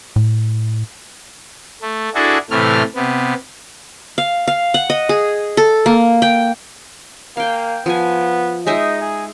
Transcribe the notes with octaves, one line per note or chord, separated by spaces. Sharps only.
A2
A3
D4 E4 F#4 G#4 A4
A2 C3 E3 A3 F6
C3 B3
F5
F5
F#5
D#5
G#4
A4
A#3
G5
A#3 F5 G5
F3 B3 G#5
G#3 D#4 D#5 E5
G#4